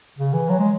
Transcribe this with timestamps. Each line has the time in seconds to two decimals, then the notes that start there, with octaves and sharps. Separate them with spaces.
0.19 C#3
0.33 E3
0.49 F#3
0.59 G#3